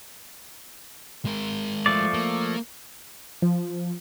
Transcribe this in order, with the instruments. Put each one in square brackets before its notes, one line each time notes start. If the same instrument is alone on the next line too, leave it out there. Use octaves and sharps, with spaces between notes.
[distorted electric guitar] G#3 A#4
[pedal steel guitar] F3 A3 D5
[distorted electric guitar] A#3
[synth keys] F3